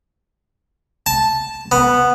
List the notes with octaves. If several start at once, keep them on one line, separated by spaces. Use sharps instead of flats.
A5
B3